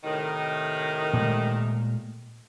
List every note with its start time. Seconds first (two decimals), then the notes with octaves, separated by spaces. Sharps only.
0.04 A2 C3 D#3
1.13 A#2 G#3 A3